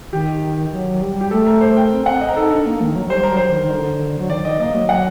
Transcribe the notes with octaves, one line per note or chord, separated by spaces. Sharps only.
D#3 G4
F#3
G3
G4
A3 A4
A#4
C5
G5
C4
C4 F#5
D#5
A#4
D#4 A4
D4 A#4
A#3
D#3
F#3
F#3
G3 C5
A#4
F#3
C5
D#3
D#3
D3
F#3
D#3 D5
D#3 D#5
A#3 D#5
F#3
F#5